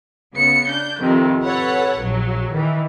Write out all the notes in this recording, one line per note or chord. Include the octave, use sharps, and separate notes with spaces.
C#3 B3 C#7
D4 G6
F2 C3 D#3
A4 B4 C#5 F#5
A#1 F#3
D#3 E3